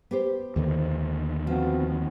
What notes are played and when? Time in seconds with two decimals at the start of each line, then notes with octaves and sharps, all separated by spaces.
0.11 B3 G4 C5
0.56 D#2 D3 D#3
1.47 F3 B3 C4 F#4